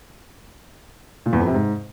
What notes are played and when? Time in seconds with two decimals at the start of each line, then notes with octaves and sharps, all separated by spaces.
1.26 A#2
1.33 E2
1.40 F2
1.47 C3
1.54 G#2